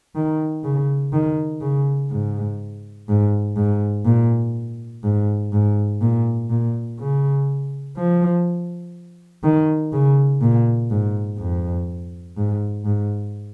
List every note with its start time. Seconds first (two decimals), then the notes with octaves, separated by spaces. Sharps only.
0.15 D#3
0.64 C#3
1.13 D#3
1.61 C#3
2.11 G#2
3.09 G#2
3.56 G#2
4.05 A#2
5.04 G#2
5.53 G#2
6.01 A#2
6.50 A#2
7.00 C#3
7.97 F3
9.44 D#3
9.93 C#3
10.42 A#2
10.90 G#2
11.38 F2
12.37 G#2
12.85 G#2